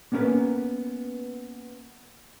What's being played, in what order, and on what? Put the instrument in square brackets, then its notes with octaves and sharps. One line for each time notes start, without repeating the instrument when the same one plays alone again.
[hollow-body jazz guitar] A#3 B3 C#4 D4 A#4 B4